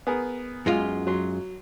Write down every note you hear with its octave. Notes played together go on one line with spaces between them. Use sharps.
B3 G#4 A#4
F#2 G#3 F4
F#3 C6